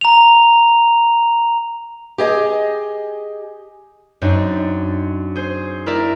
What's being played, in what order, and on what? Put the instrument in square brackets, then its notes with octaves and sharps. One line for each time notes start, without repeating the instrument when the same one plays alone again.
[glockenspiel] A#5 F7
[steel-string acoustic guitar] G4 G#4 D#5 G#5
[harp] F#2 C4 D4 D#4
G#4 C5
E4 A#4 D5 E5